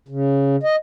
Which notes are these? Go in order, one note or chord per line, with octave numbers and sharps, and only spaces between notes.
C#3
D#5